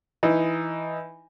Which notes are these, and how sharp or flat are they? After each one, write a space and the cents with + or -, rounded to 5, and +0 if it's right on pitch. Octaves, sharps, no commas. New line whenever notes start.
E3 +0 D#4 +10